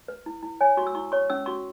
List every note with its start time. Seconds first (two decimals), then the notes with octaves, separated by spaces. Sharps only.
0.08 B4
0.26 E4
0.43 E4
0.61 C#5 G#5
0.77 F#4 C#6
0.87 E6
0.95 E4 C#6
1.12 C#5 C#6
1.30 C#4 E6
1.46 F#4 C#6